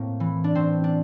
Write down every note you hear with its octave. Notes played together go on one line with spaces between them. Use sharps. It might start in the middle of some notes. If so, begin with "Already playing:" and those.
Already playing: A2 A#3 C4
E3
D4
A2 C4
D4